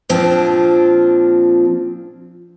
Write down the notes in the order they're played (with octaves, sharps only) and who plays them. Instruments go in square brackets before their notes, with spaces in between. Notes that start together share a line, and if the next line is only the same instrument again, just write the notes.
[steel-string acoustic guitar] A#2 F3 C4 D4 F4